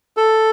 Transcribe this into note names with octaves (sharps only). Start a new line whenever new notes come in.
A4